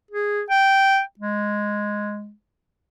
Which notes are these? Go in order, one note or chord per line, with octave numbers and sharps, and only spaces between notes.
G#4
G5
G#3